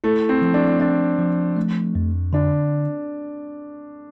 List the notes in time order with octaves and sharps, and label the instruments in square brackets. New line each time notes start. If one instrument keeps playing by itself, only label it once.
[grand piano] A3 [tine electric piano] E4
[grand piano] C4
[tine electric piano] F3
[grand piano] D4
[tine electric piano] C4 [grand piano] D4
[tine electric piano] F3
A3
F2
[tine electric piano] D3 [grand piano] D4